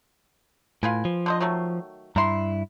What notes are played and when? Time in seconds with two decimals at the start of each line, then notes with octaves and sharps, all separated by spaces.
0.83 A2 F4 B4 G#5
1.05 F3
1.26 D3 C5 D#5
1.40 D#3 F#3 A3
2.16 G2 E4 A#5 C6